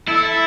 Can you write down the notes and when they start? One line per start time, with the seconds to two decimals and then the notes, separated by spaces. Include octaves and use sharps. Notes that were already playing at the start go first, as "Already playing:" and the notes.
0.08 E4 A4